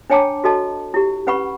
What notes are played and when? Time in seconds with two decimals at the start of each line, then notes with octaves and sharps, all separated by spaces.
0.10 D4 C#5 G5 A5 A#5 D6
0.44 F#4 A4 D#5 A5
0.94 E4 G4
1.27 C#4 B4 F#5 B5 C#6